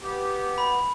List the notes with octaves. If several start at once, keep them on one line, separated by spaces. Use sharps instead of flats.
B3 G4
B5